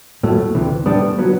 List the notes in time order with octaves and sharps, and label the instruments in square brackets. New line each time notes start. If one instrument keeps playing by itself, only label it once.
[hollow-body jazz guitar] A2 F#3 A3
D2 C3 E3
A2 G3 B3 D4
F#3 B3